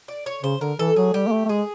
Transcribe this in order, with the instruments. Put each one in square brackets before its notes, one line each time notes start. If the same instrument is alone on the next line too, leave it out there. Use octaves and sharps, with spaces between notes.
[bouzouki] D5
C#5
[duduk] C#3 [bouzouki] C5
[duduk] D3 [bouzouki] A#4
[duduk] E3 [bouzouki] A4
[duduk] F#3 [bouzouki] G#4
[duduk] G3 [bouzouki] G4
[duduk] A#3
A3
A3
[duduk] G#3 [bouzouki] G#4